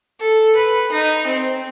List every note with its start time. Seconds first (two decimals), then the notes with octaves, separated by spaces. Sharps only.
0.20 A4
0.56 B4
0.92 D#4
1.27 C4